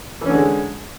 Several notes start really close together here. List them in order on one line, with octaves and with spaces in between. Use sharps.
E3 C#4 D3 G#3